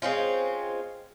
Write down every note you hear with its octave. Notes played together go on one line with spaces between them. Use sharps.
G#3 C4 C#4 F4